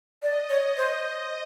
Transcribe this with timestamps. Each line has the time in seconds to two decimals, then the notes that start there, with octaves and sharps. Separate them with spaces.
0.23 D5 D#5
0.49 C#5
0.77 C5